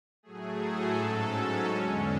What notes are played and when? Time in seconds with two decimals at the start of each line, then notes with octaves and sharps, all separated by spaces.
0.23 A2 F#3 A3 G#4
0.60 A4
0.96 G#2 F#3 C#4
1.69 E2 D3 G#3 C#4